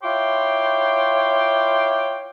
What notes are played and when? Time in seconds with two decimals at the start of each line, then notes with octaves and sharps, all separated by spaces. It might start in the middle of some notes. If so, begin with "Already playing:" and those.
0.03 E4 F4 C#5 G5 C6 D6